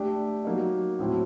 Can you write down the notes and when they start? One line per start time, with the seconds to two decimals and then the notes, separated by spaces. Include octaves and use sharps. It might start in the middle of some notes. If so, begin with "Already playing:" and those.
Already playing: A3 D4 G4
0.45 F#3 A#3 D#4
0.99 A2 F#3 A3 C4 E4